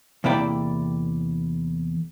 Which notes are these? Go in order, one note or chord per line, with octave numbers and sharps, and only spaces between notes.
E2 C3 A#3 E4 D5 G5